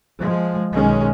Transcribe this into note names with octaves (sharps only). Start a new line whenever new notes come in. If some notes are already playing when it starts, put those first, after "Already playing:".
F3 G#3
B1 D#3 G#3 C#4